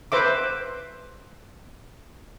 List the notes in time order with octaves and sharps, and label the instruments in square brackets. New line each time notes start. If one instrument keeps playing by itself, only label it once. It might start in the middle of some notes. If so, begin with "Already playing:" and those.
[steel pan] B4 C5 E5 D6